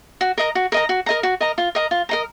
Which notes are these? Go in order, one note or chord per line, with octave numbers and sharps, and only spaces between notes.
F#4
A#4 D#5 A#5
F#4
A#4 D#5 A#5
F#4
A#4 D#5 A#5
F#4
A#4 D#5 A#5
F4
A#4 D#5 A#5
F4
A#4 D#5 A#5